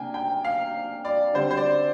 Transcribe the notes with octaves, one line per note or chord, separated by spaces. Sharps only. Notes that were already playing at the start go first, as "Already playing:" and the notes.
Already playing: C3 A#3 D4 G5 G#5
G5
F5
D5
D3 G3 C4 C5
C5
D5